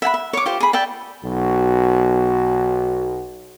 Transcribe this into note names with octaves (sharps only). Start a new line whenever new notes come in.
E5 F#5 G#5 B5
E5
C#5 D6
F4 G4 C5
G#4 B5
D5 E5 G5 A5
B1 F#4